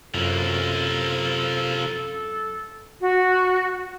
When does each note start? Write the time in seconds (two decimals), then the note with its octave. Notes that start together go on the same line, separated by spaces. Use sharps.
0.14 F#2 C3 F3 A#3 F4 A4
3.01 F#4